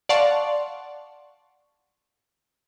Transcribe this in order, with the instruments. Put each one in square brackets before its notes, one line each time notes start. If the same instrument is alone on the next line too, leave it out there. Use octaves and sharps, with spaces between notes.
[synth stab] D5 F5 F#5 A5 C6 C#6